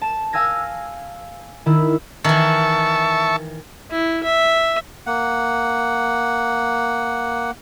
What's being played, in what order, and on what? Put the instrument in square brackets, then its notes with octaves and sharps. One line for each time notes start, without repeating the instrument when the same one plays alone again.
[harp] A5 E7
F5 G#5 E6 G#6 A#6
D#3 E4
[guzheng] D#3 E3 [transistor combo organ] E5 A5 C#6
[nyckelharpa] E4
E5
[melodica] A#3 F#5